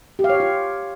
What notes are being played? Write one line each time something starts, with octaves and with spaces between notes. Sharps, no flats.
G4
F5
C#5
G4
F4